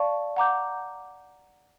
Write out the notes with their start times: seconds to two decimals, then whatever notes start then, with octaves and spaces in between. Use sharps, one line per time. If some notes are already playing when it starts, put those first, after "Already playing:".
Already playing: D5 F5 A5 C#6
0.36 F#5 A#5 D6 G6